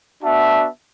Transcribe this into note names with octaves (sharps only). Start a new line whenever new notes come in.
B3 D4 F#4 E5 A5